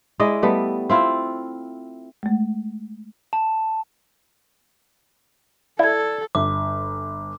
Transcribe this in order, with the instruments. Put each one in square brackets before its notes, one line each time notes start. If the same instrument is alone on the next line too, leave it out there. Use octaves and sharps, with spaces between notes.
[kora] G#3 E4 D5 D#5
G3 A3 B3
C4 E4 F4
[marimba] G#3 A3
[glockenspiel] A5
[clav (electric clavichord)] E4 [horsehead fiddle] A4 [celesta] D5 G#6
[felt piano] G1 [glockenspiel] D6